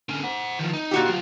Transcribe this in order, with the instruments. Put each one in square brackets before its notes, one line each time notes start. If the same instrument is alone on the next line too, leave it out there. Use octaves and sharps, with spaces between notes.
[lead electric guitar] D3 C#4
C5 F#5
D#3 F3
D#4
[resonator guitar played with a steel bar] A#2 F#4 G4
[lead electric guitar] F#3 F4